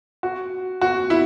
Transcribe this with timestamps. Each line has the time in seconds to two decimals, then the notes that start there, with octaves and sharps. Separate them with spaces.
0.23 F#4
0.81 F#4
1.10 E4